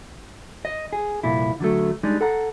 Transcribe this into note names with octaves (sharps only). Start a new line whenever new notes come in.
D#5
G#4
C2 F2 A#2 E4
D3 F#3 A3
G3 G#3 D4 D#4
A4 F#5 A#5